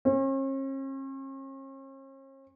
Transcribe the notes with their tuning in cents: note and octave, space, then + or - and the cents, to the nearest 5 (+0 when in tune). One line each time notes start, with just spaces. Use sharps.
C#4 -45